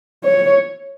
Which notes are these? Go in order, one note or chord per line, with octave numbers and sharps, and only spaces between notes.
C#5